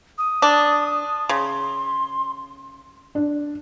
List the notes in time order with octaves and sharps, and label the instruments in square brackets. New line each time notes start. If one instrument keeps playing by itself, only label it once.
[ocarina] D#6
[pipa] D4
[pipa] C#3 [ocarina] C6
[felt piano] D4